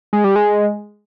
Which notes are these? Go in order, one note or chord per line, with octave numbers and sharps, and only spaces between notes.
G#3
G3
G#3